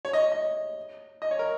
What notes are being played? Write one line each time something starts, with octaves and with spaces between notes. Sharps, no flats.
C#5
D#5
D#5
D#5
C#5
A#4